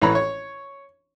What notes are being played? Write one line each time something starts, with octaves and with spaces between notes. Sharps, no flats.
A1 E3 B4 C#5 A#5 B5
C#5